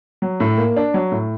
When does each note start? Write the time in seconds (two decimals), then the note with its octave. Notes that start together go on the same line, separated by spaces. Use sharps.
0.22 F#3
0.40 A2
0.58 A#3
0.77 D4
0.94 F#3
1.12 A2